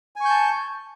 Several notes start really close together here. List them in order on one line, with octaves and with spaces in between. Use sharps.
G#5 C#6 G6 A5